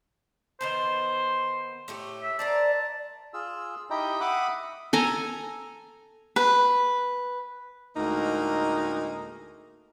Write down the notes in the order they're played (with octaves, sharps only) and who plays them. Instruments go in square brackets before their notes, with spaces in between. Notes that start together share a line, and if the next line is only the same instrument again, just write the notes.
[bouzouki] D#3 B3 A5 [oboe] C5
[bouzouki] A2 A3 G4
[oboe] E5
[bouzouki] A#4 C5 D5 [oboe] A5
[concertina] F4 G#4 E6
D#4 E4 G4 D#5 G5 A#5
E5 F#5 B5 D6 D#6 F#6
[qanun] A4 G#5 A#5
[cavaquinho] B4
[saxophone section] D2 A2 G#3 A#3 D#4